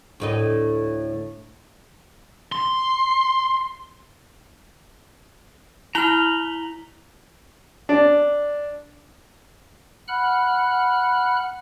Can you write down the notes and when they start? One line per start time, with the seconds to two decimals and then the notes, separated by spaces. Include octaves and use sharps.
0.20 D2 A2 D#5
2.52 C6
5.95 E4 A#5 B5 F6 F7 G7
7.89 D4
10.08 F#5 B5 F6 F#6